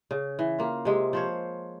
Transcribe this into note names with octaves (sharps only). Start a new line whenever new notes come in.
C#3
E3
A#3 F4
C3 G#3 G#4
F3 C5 C#5